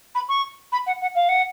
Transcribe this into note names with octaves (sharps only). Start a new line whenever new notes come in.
B5
C#6
B5
F#5
F#5
F5
F#5